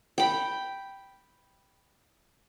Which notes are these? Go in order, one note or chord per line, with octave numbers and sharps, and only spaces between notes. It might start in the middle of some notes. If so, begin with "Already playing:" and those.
G5 B5